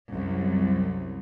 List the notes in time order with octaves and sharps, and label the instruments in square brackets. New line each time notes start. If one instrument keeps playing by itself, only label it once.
[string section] C2 F#2